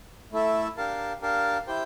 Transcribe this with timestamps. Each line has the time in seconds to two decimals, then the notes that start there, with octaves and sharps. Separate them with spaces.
0.32 A3 E4 A4 E5
0.77 D4 G4 A#4 F5 A5
1.22 D4 G4 A#4 F5 A5
1.67 E4 G4 C5 G5